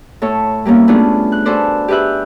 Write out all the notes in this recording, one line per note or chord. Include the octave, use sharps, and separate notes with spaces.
A2 A4 C#5
G3 A#3 B3 C#4 E4
A3 B3 C#4 D4 F4 G#4
F#6
F#4 G#4 A4 B4 C5 D5
G4 G#4 B4 E5 F#6